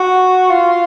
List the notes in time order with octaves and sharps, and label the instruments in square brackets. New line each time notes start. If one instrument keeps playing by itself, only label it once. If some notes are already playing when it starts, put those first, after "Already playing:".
Already playing: [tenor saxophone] F#4
F4